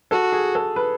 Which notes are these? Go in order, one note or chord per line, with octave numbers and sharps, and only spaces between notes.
F#4 A4
G#4
A4
B4